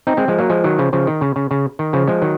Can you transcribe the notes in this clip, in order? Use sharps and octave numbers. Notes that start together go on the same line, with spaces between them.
C4 D#4
G#3 C4
F3 G#3
F#3 A#3
F3 G#3
D#3 F#3
C#3 F3
C#3 F3
D#3
C#3
C#3
C#3
D#3
C#3 F3
F3 G#3
D#3 F#3